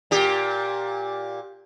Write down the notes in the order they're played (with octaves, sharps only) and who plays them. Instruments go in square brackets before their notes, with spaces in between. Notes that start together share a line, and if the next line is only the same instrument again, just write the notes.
[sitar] A#2 G4